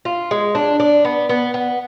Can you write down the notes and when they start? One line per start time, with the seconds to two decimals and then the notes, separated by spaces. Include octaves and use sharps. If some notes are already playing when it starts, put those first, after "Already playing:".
0.05 F4
0.31 G#3
0.55 D4
0.80 D4
1.05 B3
1.29 B3
1.54 B3